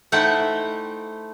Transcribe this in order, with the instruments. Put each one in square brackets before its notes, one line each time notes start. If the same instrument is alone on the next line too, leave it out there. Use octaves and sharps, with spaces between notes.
[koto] A3 D#4 E4 C5 F#5 G5